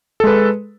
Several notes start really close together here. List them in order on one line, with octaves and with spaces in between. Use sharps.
A4 G#3 B4